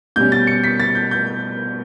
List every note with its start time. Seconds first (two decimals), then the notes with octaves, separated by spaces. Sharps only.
0.16 B2 G3 C#4 G6
0.32 A6
0.47 C#7
0.64 B6
0.80 A6
0.95 G6
1.11 G6